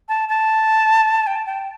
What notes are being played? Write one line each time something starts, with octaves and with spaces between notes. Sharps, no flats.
A5
A5
G5
A5
G5